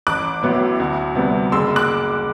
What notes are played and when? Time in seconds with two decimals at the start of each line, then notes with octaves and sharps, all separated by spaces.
0.07 A1 D6 F#6
0.43 A2 F#3 B3
0.80 D2
1.15 C3 G3 B3
1.52 F#1 C6 E6
1.76 D6 F#6